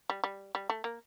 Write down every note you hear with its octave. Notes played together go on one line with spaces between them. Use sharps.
G3
G3
G3
A3
A#3